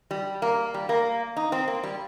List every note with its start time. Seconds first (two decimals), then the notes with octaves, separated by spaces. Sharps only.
0.11 G3
0.42 A#3
0.74 G3
0.89 A#3
1.37 D#4
1.52 C4
1.68 A#3
1.83 G3